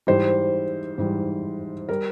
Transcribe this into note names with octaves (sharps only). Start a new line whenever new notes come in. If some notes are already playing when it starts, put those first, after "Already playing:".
G#2 E3 G3 C5
G#2 E3 G3
G3 A#4